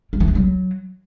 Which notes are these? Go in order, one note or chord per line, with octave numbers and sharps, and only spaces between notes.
G3
E3
C3
F#3